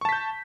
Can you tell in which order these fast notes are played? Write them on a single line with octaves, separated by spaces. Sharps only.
C#6 A5 B6 G6